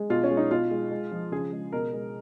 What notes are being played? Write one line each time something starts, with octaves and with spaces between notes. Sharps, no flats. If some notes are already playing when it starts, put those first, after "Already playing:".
Already playing: G#3
B2 F4
C#4
G#3
D#4
B2 F4
G#3
G#3
F3
C#3 G#4
G#3
B2 A#4
G#3